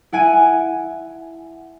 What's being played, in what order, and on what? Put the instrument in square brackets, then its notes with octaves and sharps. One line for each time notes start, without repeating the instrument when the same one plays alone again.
[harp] E4 F#5 G#5 D7 D#7